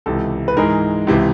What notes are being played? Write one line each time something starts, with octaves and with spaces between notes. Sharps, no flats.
C#2 C3 E3 A4
B4
G#2 E3 G#3 A#4
C#2 C3 E3